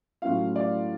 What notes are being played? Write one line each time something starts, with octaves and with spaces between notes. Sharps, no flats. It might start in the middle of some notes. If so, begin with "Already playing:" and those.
A2 F#3 A3 C#4 F4 F5
D5